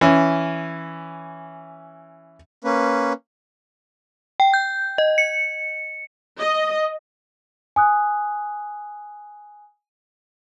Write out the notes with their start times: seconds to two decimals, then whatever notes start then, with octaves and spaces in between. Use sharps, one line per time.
0.01 E3 C#4
2.64 A#3 C#4 B4
4.40 G5
4.54 G6
4.98 D#5
5.18 C#7
6.40 D#5
7.76 G#5 D#6 F#6